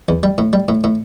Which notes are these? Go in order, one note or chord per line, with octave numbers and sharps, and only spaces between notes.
E2
G3
A2
G3
A2
A2